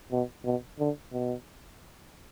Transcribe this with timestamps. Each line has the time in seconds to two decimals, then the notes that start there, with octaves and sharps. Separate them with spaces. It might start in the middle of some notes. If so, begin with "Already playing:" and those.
0.12 B2
0.45 B2
0.80 D3
1.13 B2